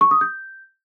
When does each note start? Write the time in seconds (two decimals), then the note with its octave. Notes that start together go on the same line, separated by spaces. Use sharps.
0.01 C#6
0.11 D#6
0.21 G6